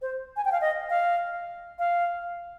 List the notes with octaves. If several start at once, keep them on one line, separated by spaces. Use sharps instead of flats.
C5
G#5
G5
F5
D#5
F5
F5